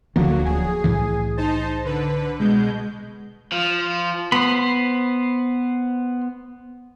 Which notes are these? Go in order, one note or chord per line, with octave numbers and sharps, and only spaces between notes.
D1 D3 F3 F#3 A#3 F#4
G#4
C2 A2 E3
D#4 C5 A5
D3 B4
B2 G#3 G6
F3
B3 C5 B5